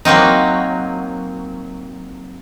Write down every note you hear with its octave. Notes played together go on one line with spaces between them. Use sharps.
F#3 A#3 C4 D#4